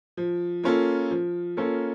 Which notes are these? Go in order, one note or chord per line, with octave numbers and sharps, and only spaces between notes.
F3
A#3 C#4 F4 A4
F3
A#3 C#4 F4 A4